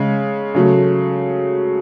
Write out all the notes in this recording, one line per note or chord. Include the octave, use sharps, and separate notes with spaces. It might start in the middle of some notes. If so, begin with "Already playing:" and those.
Already playing: C#3 G#3
C#3 F#3 A3